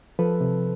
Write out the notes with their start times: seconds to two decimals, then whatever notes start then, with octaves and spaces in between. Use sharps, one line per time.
0.19 F3 A4 B4
0.41 C3